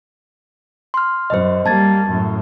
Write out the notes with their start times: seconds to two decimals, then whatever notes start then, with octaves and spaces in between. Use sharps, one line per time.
0.94 C6 F6
1.30 F#2 C5 D#5
1.66 G3 A#3 A5 G#6 A6
2.08 F#2 A2